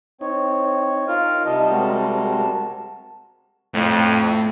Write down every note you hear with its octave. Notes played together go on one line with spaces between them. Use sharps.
C4 D#4 C#5
F4 A#4
C3 G3 D#5 A5
G#3 C4 F#4 A#4
A5
F2 A2